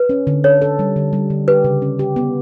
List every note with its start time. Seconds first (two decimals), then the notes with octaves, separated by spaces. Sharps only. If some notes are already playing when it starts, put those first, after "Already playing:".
Already playing: B4
0.09 C#4
0.27 D3
0.44 A4 C#5
0.62 A4
0.79 G3
0.96 D3
1.13 G3
1.30 D3
1.48 G4 B4
1.64 C#3
1.82 C#4
1.99 G4
2.16 B3